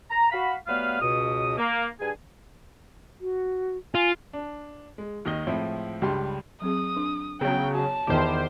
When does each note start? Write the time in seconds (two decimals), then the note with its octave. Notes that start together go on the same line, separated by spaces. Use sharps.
0.11 A#5
0.31 F#4 F5 B5
0.67 F#3 G3 A3 B3 B4 F5
1.01 C#2 B2 D#6
1.58 A#3
1.99 G2 G#4 G#5
3.21 F#4
3.95 F4 G#5
4.33 D4
4.98 G#3
5.25 D#2 D#3 D#5 G7
5.47 A2 F3 G#3 C4 E4
6.02 C#2 G2 G3 G4 C6
6.62 F#3 C4 G#4 D#6
6.96 D4
7.41 C#3 F#3 B3 G5
7.75 F#4 C#5 A5
8.07 E2 D#3 F4 G4 C5